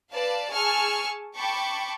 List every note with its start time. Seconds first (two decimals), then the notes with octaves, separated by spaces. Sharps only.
0.10 B4 D5 F5 A5
0.52 G#4 G#5 A5 C#6 E6 F6
1.36 G5 A5 B5 C#6 D6